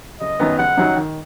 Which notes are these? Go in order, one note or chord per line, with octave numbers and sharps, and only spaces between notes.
F#1 D#5
F#2 D#3 B3
F#1 F#5
F#2 D#3 F#3 D#4
D#3